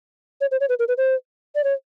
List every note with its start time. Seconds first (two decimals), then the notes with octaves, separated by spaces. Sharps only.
0.41 C#5
0.51 C5
0.60 C#5
0.69 B4
0.79 A#4
0.88 B4
0.97 C5
1.55 D5
1.64 C#5